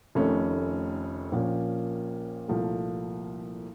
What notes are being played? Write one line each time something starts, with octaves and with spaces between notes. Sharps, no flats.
F1 F2 D#3 A3 C#4
A#1 A#2 F3 A#3 C#4
C2 A#2 F3 A3